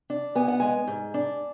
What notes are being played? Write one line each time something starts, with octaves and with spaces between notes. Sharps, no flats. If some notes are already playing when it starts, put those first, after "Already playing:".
D4
B3 G#5
F#5
G#3 G#5
G#2
D4